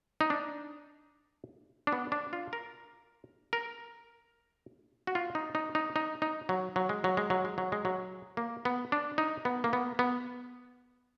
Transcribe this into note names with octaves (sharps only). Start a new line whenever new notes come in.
D#4
D4
D4
B3
D4
F4
A#4
A#4
F#4
F4
D#4
D#4
D#4
D#4
D#4
F#3
F#3
G#3
F#3
G#3
F#3
G#3
F#3
G#3
F#3
A#3
B3
D4
D#4
B3
A#3
B3
B3